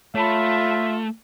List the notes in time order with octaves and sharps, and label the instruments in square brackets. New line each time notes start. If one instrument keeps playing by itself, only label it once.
[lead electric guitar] A3 [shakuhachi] F4 [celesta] C#5 A5 B5 [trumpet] E5